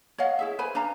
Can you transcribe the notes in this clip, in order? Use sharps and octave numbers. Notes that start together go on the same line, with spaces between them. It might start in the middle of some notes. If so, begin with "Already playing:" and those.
C#5 D#5 F5 F#5
E4 G#4 E5
B4 C5 G#5 B5
D4 B4 F5 A#5